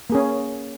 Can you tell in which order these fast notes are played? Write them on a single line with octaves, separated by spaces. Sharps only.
A#3 G#4 C#4